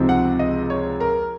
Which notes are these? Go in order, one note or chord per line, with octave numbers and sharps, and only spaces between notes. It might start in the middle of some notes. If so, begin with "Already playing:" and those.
Already playing: C#2 C3 F3 C4 D#4
F#5
D#5
C#5
A#4